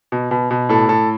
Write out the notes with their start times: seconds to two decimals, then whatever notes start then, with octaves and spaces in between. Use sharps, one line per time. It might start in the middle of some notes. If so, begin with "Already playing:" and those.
0.12 B2
0.31 B2
0.51 B2
0.69 A2 A4
0.89 A2 A4